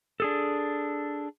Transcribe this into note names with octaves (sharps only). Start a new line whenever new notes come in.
D4 G#4 A4